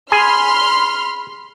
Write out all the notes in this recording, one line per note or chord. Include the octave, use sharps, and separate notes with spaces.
G#4 G#5 B5 C6 F6